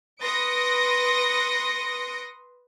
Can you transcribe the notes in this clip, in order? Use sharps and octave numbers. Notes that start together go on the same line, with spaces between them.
B4 C6 D#6 A#6 C#7 D7